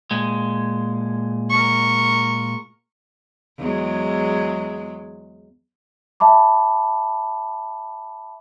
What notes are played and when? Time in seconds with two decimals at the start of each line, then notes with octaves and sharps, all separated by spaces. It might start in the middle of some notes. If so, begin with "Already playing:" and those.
0.11 A#2 G#3
1.50 A#4 C#6
3.58 E2 F#3 G#3
6.20 E5 A5 B5 D6